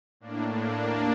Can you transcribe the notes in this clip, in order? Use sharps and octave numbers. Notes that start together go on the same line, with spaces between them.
A2 A#3 D4
A#3 D4
D#2